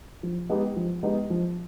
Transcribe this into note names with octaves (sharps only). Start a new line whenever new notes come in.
F3
G#3 B3 D#4 G4
F3
G#3 B3 D#4 G4
F3